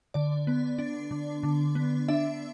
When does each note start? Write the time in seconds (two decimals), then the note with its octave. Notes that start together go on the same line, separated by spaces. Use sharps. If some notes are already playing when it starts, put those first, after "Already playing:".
0.14 D3 D5
0.47 B3
0.78 D4
1.11 D3
1.43 D3
1.75 B3
2.08 D4 E5